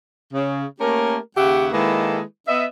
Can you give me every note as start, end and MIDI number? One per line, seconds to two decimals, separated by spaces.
0.33 0.64 49
0.81 1.17 57
0.81 1.17 58
0.81 1.17 61
0.81 1.17 67
0.81 1.17 70
1.37 1.69 39
1.37 1.69 49
1.37 1.69 67
1.37 1.69 76
1.37 1.69 78
1.73 2.21 51
1.73 2.21 56
1.73 2.21 58
1.73 2.21 64
1.73 2.21 69
1.73 2.21 71
2.48 2.66 59
2.48 2.66 75
2.48 2.66 76